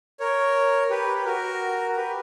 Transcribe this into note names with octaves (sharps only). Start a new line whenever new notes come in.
A#4 C#5
G4 B4
B4
F#4 A#4
A#4
G4 B4